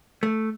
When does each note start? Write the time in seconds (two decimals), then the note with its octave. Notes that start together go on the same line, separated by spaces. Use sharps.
0.23 A3